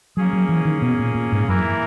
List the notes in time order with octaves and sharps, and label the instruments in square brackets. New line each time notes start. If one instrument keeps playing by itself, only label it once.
[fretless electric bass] F#3 [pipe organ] A#3 C#4 G#4
[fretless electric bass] F#3
E3
D#3
B2
A#2
A#2
G#2
[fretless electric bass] F#2 [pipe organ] E3 A#3 E4 A#4